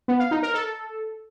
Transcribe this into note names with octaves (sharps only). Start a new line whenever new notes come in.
B3
F5
D#4
A#4
A4